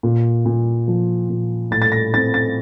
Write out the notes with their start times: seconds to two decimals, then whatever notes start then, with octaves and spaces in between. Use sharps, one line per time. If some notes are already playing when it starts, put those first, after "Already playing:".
0.03 A#2
0.46 A#2
0.88 F3
1.29 A#2
1.71 A2 A6
1.82 A6
1.92 A#6
2.14 C4 A6
2.34 A6